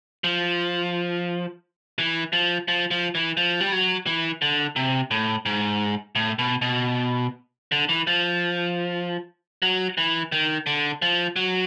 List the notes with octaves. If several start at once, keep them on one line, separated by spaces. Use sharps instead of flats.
F3
E3
F3
F3
F3
E3
F3
G3
F#3
E3
D3
C3
A2
G#2
A2
B2
B2
D3
E3
F3
F#3
E3
D#3
D3
F3
F#3